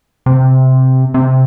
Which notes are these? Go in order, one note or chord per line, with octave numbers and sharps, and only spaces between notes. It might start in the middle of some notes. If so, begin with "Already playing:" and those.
C3
C3